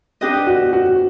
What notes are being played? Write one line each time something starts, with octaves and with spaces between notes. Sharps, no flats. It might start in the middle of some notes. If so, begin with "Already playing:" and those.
D4 G4 B4 D#5
F#4
F#4